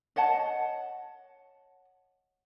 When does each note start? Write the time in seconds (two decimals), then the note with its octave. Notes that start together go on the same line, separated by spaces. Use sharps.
0.16 C#5 D#5 F#5 A5